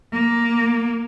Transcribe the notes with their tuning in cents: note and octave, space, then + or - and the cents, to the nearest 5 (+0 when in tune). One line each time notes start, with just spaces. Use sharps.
A#3 +5